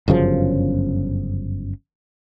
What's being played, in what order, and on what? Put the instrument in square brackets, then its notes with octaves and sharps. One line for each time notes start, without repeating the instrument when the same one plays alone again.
[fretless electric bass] G1 F#2 C#3 F3